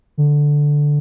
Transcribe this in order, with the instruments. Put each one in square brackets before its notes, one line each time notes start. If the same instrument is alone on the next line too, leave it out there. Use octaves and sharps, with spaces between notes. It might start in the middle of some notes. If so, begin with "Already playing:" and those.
[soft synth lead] D3